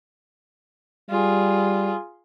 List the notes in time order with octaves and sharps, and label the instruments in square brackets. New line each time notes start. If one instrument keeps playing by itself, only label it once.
[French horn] G3 [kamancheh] F4 G#4